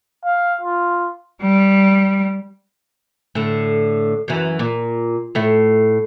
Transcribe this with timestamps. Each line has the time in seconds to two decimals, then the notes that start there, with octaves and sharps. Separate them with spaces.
0.25 F5
0.61 F4
1.42 G3
3.35 A2 D3
4.28 F#2 E3
4.59 A#2
5.35 A2 A3